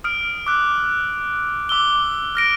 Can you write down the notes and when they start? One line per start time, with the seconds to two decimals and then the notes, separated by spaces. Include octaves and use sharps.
0.04 D#6 F6 D7
0.47 D6 E6 F#6
1.69 D6 E6 G7
2.35 F6 A#6 D7